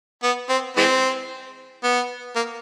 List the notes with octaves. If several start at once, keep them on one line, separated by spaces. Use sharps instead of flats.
B3
C4
E3 G#3 C4
B3
A#3